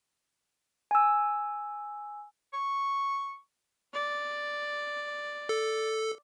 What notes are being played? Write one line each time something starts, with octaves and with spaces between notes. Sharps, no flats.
G#5 E6
C#6
D5
A4